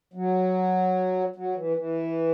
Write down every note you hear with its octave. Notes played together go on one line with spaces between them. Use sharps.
F#3
F#3
E3
E3